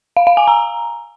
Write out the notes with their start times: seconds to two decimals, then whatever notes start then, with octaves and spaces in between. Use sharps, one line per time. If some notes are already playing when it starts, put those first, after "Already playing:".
0.17 F5
0.27 F5
0.37 G#5
0.47 A#5